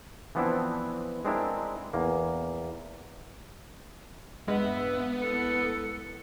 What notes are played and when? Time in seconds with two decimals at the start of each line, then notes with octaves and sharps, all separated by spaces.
0.35 E3 F3 B3 C4 D4 E4
1.25 G#3 C4 D4 E4 A#4
1.93 E2 A#3
4.48 G2 G#3 B3 B4 E5 F#5
5.21 C2 A4 C#7